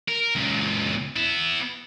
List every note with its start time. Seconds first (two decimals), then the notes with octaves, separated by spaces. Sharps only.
0.08 A#4
0.35 C#2 A#2
1.16 B3 E4